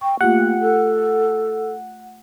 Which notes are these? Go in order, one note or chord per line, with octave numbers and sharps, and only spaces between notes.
G5 C#6
A3 A#3 F4 G4 F#5
G5
A4